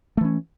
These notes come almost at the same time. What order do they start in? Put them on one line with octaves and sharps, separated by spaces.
A3 E3 C#4